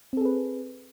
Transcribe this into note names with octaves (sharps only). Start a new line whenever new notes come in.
C4 G#4 A4 B4